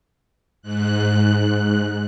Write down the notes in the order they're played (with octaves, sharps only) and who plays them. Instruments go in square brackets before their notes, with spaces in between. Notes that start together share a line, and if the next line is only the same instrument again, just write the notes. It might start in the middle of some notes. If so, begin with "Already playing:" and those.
[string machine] G#2 F#6